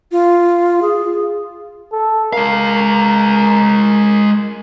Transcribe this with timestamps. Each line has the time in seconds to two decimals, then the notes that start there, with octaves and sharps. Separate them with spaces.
0.12 F4
0.82 G#4
1.92 A4
2.33 G#3 A#4 F5